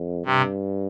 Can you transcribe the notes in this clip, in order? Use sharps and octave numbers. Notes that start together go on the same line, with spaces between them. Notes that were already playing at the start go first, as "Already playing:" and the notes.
Already playing: F2
G2 C3